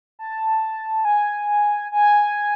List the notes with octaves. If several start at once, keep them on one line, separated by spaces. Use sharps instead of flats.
A5
G#5
G#5